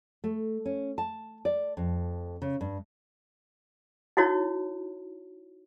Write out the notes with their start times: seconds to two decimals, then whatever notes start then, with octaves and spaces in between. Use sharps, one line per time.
0.24 A3
0.66 C#4
0.98 A5
1.45 D5
1.77 F2
2.42 C#3
2.61 G2
4.17 D#4 E4 F#4 C#5